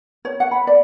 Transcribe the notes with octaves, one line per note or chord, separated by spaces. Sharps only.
C#5
F#5
B5
D5